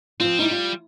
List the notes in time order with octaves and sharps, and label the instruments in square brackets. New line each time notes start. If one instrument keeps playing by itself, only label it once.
[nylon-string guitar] F3 F4 [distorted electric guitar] C4
[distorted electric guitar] G3 [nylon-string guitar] D#4 E4
[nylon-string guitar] F4